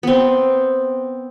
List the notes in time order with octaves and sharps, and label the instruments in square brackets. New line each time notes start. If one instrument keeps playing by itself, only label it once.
[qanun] B3 C4